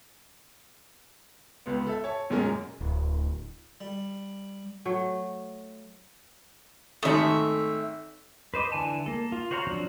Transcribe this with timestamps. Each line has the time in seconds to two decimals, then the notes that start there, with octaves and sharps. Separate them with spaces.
1.66 C#2 B3
1.86 A4 E5
2.04 C#5 A5
2.30 E1 F#2 A#2 G#3 C#4 A#4
2.81 D1
3.81 G3
4.85 F#3 A3
7.03 G#1 A3 D#4 E5 D#6
8.54 B4 C5 D#5 D6
8.72 D3 E3 G#5 A5
9.06 A#3 A4
9.32 F4
9.51 F#4 C5 C#5 F5 A#5
9.67 F3 F#3 C4 D4 F#4